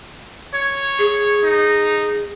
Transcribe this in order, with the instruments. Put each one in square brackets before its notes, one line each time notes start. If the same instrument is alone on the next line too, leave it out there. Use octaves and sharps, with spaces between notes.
[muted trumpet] C#5
[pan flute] G#4
[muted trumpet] D#4